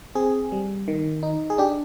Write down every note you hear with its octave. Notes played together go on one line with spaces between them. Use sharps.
C4 G#4
G3
D#3
D#4
G#4
D4 G4